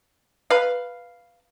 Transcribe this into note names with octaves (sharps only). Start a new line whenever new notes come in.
B4 F5